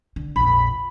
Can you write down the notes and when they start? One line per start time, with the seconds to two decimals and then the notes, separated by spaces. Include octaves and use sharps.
0.16 D3
0.36 A#1 F2 B5